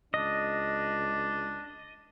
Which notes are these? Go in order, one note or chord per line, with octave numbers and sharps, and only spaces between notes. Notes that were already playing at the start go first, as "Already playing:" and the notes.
C#2 D4 D#5